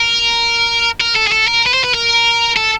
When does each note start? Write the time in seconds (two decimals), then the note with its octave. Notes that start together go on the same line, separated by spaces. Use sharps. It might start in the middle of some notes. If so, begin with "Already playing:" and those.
Already playing: A#4
1.01 A#4
1.16 A4
1.27 G#4
1.32 A4
1.48 A#4
1.66 B4
1.73 C5
1.84 B4
1.94 A#4
2.56 A4